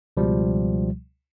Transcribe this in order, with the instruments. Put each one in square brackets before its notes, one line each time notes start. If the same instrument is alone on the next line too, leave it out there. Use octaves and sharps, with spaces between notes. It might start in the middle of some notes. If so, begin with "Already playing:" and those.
[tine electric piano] C#2 B2 F3 G3